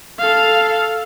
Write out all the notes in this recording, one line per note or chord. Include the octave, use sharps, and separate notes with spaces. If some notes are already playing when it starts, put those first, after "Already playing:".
A4 F5